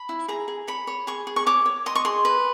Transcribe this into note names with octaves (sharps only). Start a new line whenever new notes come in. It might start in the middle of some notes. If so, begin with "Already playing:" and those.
Already playing: B5
E4
G#4 A#5
G#4
C#5 B5
C#5
G#4 C#6
G#4
C#6
C#5 D6
C#5
D#5 C6
C#6
G#4 C6
B4